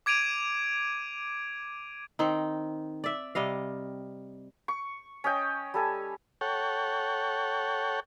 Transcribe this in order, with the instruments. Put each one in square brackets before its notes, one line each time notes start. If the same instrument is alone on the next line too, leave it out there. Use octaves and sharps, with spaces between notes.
[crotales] D6 G#6 D7 D#7 F7
[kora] D#3 C4 D#4
D5 E5
C3 G3 D#5 F5
[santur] C#6
C#4 D#5 G5
G3 A4 G#5
[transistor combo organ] A4 C#5 F#5 G5